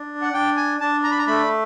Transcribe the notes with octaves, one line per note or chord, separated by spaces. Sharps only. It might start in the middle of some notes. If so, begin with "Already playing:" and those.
Already playing: D4
F#5
D4 G5
G#5
D4 A5
A#5
B5
A#5
A3 B5